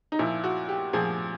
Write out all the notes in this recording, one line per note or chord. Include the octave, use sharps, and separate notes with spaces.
D#4
A#2 F3 E4
F#4
G4
A#2 F3 G#4